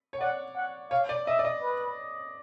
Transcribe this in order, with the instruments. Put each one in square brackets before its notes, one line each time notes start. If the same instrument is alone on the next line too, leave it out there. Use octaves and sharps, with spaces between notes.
[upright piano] C#5
[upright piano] D5 [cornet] F#5
[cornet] F#5
[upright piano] C#5 [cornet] F5
[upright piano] D5
[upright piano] D#5 [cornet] E5
[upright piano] D5
D#5
[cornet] B4